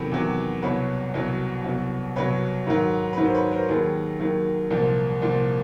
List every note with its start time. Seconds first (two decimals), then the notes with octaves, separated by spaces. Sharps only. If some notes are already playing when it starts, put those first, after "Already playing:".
Already playing: E2 C3 D#3 F#3 A4 B4
0.12 E2 C3 D#3 F#3
0.62 C2 B2 F#3 B4 C#5
1.14 C2 B2 F#3
1.64 C2 B2 F#3
2.16 C2 B2 F#3 B4 C#5
2.67 G#2 D#3 F#3
3.13 G#2 D#3 F#3 B4
3.24 C5
3.35 B4 C#5
3.52 A#4 C5
3.68 D#2 D#3 F#3 G#4 A#4
4.20 D#2 D#3 F#3
4.70 C2 A#2 F3
5.22 C2 A#2 F3